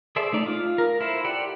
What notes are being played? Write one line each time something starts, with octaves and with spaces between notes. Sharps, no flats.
G#4 A4 C5 D5 E5
A3 D#4 D5
F4
A#4
E4 A4 C5
G4 D5 F#5